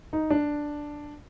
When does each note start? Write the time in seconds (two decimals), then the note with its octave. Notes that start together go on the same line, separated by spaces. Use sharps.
0.13 D#4
0.31 D4